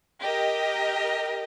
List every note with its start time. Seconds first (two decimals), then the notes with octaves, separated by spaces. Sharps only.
0.21 G4 A#4 D#5